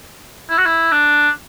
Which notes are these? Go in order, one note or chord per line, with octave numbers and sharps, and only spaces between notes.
E4
F#4
E4
D4